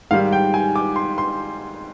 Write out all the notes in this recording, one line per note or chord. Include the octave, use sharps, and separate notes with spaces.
G#2 D#3 G3 F5
G5
G#5
D6
C6
C6